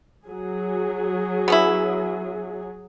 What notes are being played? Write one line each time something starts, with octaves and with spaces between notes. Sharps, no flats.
F#3 G#4
B3 C#4 E4